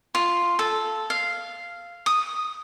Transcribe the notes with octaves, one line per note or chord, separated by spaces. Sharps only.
F4
A4
F5
D#6